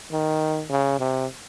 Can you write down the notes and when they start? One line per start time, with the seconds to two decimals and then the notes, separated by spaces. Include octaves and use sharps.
0.11 D#3
0.69 C#3
0.99 C3